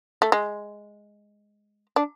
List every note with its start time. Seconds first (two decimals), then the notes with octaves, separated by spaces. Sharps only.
0.22 A3
0.32 G#3
1.96 D4